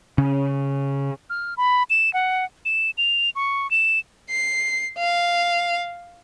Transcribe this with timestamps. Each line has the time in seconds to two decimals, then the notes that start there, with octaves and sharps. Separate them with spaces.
0.18 C#3 C#4
1.30 F6
1.57 B5
1.90 E7
2.14 F#5
2.65 E7
2.98 F7
3.35 C#6
3.71 E7
4.31 C7
4.98 F5